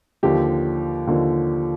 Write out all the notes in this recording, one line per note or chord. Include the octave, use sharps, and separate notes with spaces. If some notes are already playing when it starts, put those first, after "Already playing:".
D#2 D3 F3 G4
D#2 D3 F3